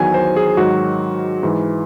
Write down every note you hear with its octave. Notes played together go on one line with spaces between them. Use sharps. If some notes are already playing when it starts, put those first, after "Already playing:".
Already playing: E2 D#3 F#3 G#5
C5
G#4
G#2 D#3 F#3 F#4
G#2 E3